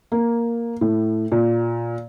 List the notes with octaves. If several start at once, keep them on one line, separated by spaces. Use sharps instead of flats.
A#3
A2
A#2